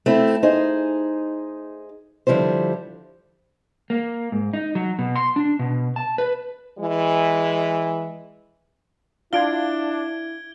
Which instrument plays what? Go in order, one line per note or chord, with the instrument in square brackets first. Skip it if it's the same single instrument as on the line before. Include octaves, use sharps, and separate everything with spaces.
[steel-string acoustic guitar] A3 C4 E4
D#4 G#4 C5
D3 F3 G3 E4 C5
[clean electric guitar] A#3
G#2
D#4
F#3
B2
C6
D4
B2
A5
B4
[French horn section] E3 G#3
[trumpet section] D4 [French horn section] E4 [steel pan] F4 F5 [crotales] G#6 D7 G7